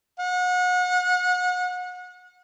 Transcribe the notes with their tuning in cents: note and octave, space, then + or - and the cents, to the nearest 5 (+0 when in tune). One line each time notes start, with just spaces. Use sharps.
F#5 -35